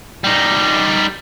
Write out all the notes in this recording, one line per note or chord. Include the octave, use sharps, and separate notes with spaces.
G3 D#4